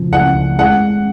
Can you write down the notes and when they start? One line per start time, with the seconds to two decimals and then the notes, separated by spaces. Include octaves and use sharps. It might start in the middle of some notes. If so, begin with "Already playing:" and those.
Already playing: C#3 F3
0.11 C#2 F#5
0.35 C#2
0.59 G#3 F#5